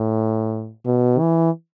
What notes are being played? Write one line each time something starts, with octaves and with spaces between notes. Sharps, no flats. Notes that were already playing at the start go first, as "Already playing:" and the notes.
Already playing: A2
B2
E3